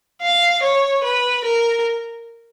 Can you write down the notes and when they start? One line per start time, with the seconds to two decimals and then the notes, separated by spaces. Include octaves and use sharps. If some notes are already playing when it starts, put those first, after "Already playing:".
0.22 F5
0.62 C#5
1.04 B4
1.44 A#4